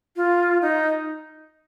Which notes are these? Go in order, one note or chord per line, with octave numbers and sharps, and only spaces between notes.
F4
D#4